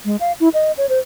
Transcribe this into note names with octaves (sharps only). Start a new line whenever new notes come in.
G#3
F5
E4
D#5
C#5
C5